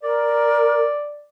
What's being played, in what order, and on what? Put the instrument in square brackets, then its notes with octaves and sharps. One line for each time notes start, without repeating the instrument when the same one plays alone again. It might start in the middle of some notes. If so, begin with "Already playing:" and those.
[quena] A#4 [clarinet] D5